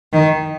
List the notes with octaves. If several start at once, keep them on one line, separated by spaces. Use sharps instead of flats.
D#3